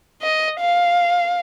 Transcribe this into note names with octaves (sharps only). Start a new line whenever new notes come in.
D#5
F5